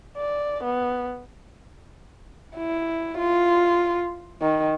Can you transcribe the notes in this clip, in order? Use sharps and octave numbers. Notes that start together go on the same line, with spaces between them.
D5
B3
E4
F4
D#3